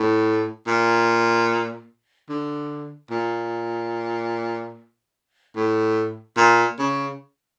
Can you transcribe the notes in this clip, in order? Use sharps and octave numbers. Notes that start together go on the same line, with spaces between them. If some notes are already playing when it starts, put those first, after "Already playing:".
Already playing: A2
A#2
D3
A#2
A2
A#2
C#3